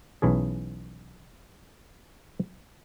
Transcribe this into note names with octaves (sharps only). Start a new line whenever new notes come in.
B1 E3 C#4 G#4